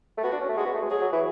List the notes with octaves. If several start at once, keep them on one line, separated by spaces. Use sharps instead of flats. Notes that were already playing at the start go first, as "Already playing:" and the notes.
A3
B3 F#4
D4
C#4
A3
G#3 F#4
B3
A3
G#3
F#3 G#4
F#3
E3